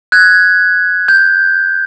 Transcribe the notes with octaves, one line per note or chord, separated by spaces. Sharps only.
F#6 G#6
G6